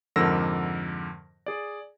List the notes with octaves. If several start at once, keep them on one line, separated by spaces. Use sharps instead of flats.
F2 G#2 D3 A#4 E6 A#6
G#4 D5